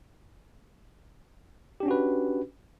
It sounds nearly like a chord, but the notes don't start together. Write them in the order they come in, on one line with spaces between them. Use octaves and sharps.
G4 D4 C#4 F#4 B4